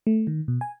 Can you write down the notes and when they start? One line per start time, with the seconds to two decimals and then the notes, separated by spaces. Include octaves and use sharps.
0.07 A3
0.27 D#3
0.48 B2
0.61 G#5